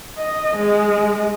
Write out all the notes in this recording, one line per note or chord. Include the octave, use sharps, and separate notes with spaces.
D#5
G#3